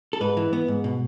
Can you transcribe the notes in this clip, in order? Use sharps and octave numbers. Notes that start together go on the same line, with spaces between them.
A4
G#2 B4
E3
B3
G#2
B2